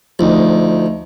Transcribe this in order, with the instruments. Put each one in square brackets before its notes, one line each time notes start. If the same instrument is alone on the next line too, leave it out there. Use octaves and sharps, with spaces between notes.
[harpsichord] D2 [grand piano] F3 D#4